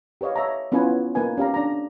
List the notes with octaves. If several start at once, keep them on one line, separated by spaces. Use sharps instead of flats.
G4 B4 C#5 D#5 F5
C#5 E5 A5 A#5
B3 C#4 E4 F4 B4 G#5
A#3 D#4 B4 G#5
C#4 G4 F5 A#5
D4 A#5